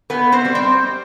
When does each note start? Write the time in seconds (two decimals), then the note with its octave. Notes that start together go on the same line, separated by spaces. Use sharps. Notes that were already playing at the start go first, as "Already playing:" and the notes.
0.10 A#2 B3 B4
0.32 C4 C5
0.45 G3
0.55 C4